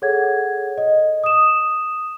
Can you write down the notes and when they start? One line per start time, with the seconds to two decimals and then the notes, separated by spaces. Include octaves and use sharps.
0.02 G#4 A4 C#5 F#5 G#6
0.78 D#5
1.24 D#6 E7